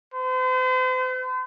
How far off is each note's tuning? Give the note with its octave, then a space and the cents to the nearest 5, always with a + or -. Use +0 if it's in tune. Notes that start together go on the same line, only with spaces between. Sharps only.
C5 -40